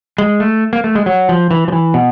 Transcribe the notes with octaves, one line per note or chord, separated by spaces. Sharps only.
G#3
A3
A#3
A3
G#3
F#3
F3
E3
F3
E3
B2